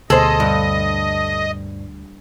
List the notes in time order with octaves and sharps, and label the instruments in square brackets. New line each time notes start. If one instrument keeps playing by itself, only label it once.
[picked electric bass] D2 B2 [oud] G#4 C5 [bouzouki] A4 [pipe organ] D#5
[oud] G2